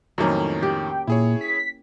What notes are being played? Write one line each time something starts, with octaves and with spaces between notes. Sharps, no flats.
F2 A2 D#3 F#3 A#3 C#4
G4
G5
A#2 E4 G#4 C#5
B6